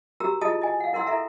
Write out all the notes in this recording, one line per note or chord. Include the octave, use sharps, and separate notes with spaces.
F#4 G4 A#4 A#5 E6
E4 F4 G#4 D#5 A5 D#6
D#5 G#5
F5 F#5
E4 A#4 F#5 C6 E6
E4 A4 E5 A#5